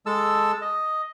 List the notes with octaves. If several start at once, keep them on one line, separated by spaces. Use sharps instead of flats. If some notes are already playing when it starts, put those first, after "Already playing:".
G#3 A4 A5 E6
D#5